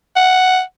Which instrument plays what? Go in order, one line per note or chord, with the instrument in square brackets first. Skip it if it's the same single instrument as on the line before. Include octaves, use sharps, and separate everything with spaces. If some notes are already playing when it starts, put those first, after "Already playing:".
[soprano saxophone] F#5